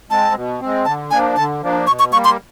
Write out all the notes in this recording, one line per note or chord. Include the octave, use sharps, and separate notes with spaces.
G#3 C4 A5
B2
G#3 C4
D3 A5
F3 A#3 D4 G#5
D3 A5
F3 A#3 D4
B2 C#6
C#6
G3 A#3 C#6
C6